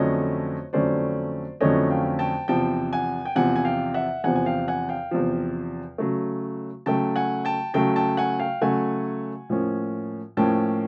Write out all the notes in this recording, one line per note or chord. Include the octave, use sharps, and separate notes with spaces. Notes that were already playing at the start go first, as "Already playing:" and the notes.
Already playing: F2 D3 F#3 A3 C#4 C#5 D#5
F2 D3 F#3 A3 C#4 C5 D5
F2 D3 F#3 A3 C#4 C#5 D#5
F5 G5
G5 A5
E2 C3 F3 G5 A5
F#5 G#5
G5
E2 C3 F3 F#5 G#5
G#5
F5 G5
E5 F#5
E2 C3 F3 F#5 G#5
G#5
F5 G5
F#5 G#5
F5 G5
E2 C3 F3
C#3 F#3 A3
C#3 F#3 A3 G5 A5
F#5 G#5
G5 A5
C#3 F#3 A3 G5 A5
G5 A5
F#5 G#5
F5 G5
C#3 F#3 A3 F#5 G#5
A2 F3 A#3 C#4
A2 F3 A#3 C#4 G5 A5